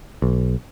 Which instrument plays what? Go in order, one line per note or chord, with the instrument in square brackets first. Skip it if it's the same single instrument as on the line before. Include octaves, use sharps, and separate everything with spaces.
[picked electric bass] B1